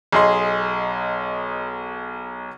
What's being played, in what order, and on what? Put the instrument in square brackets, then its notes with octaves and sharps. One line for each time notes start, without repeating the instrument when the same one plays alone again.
[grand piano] B1 G#4 D#5 C6